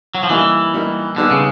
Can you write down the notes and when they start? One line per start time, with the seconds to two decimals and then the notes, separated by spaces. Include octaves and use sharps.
0.15 F#3
0.23 F3
0.30 E3 G3 A#3 D#4
0.74 G3 A#3 D#4
1.16 D3 D#3 G3 B3 D#4 G#4
1.31 C#3